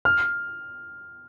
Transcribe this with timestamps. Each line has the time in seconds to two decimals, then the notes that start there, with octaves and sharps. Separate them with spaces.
0.05 F6